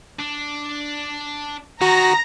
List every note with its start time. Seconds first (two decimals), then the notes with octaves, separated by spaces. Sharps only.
0.19 D4
1.81 D#3 F#4 A#5 A#6